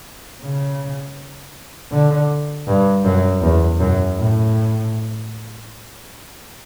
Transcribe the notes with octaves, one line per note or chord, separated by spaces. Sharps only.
C#3
D3
G2
F#2
E2
F#2
A2